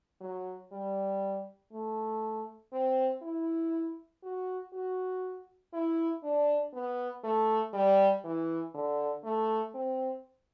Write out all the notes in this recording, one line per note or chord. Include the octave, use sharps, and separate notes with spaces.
F#3
G3
A3
C4
E4
F#4
F#4
E4
D4
B3
A3
G3
E3
D3
A3
C4